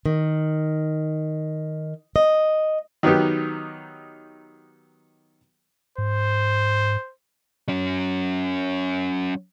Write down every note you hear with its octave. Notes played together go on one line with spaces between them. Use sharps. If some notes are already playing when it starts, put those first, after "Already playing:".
D#3
D#5
D#3 F#3 B3 D#4 G4
G#2 C5
F#3 C#4